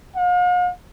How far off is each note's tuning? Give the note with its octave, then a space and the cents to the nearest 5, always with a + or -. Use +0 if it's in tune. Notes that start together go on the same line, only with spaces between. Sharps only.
F5 +45